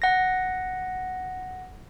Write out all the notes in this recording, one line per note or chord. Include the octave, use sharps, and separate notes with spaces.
F#5 A#6